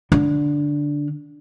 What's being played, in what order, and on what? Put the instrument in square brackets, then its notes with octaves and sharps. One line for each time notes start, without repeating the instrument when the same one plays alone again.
[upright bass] D3